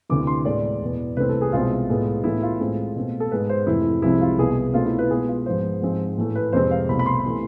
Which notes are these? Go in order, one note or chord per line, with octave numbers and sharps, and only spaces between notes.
D2 C3 E3 D6
C6
A2 G#3 B3 D5
E2 B2 B3
C2 C3 E3 A3 C4 B4
A4
G#4
C2 B2 G#3 C4 F4
A2 G#3 B3
A2 E3 B3 E4
F4
A2 G#3 C4
B2 A3 C4
A4
G#2 G#3 B3 B4
C5
F2 C3 E3 A3 C4 E4
C2 C3 F3 G#3 C4 E4
F4
C2 B2 B3 G#4
B2 A3 C4 F4
E4
B4
B2 G#3 B3 G#4
F4
G#2 F3 G#3 B3 C5
G#2 F3 G#3 C4
A2 E3 A3
B4
F2 C3 G#3 C4 C5
F5
C2 B2 A3 C4 B5
B5
C6
C3 E3 A3